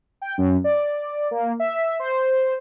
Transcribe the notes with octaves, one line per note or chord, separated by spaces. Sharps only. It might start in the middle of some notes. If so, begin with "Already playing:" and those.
G5
F#2
D5
A#3
E5
C5